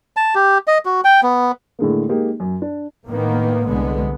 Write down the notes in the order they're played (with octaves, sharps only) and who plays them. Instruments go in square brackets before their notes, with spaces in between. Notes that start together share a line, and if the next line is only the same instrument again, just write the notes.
[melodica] A5
G4
D#5
F#4
G5
B3
[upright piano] A2 D3 G#3 A#3
G#3 A#3 D#4 G4
F#2
D4
[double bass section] A2 D#3 A#3 B3
C2 D3 G#3 B3